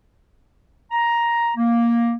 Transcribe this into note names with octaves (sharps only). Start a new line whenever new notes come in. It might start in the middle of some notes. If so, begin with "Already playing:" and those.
A#5
A#3